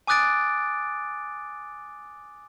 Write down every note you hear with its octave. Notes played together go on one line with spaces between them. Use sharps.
G#5 D6 D#6 F#6 A6 D7